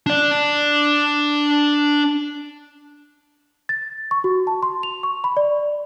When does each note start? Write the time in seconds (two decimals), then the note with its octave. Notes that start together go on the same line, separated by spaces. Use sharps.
0.06 D4 D5
3.69 A6
4.11 C#6
4.24 F#4
4.47 A5
4.63 C6
4.83 F7
5.03 C#6
5.24 B5
5.37 D5